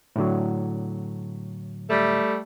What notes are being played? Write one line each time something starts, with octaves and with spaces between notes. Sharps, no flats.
A2 D3 F#3
G3 A3